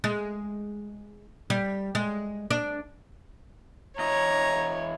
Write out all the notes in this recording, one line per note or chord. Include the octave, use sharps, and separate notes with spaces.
G#3
G3
G#3
D4
E2 C#5 D#5 A#5